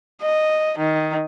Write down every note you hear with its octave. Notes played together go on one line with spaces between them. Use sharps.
D#5
D#3